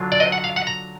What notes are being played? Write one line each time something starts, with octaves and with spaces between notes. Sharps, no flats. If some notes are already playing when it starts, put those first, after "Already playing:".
Already playing: D3 F#3 D4 F4
D5
D#5
F#5
F5
F#5
A#5